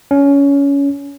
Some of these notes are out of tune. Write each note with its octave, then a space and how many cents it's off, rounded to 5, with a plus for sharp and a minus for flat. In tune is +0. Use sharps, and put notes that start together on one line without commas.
C#4 +20